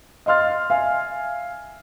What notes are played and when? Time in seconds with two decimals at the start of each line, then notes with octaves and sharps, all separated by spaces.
0.26 D#5 F5 C6 F6 A6
0.70 E5 F5 G#5